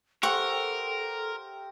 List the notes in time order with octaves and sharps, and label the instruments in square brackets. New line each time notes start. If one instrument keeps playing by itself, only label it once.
[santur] G4 C5 E5 [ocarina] A4 [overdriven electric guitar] A#4 [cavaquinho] F#5 C#6